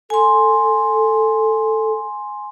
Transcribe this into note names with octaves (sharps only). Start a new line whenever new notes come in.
A4 G#5 C6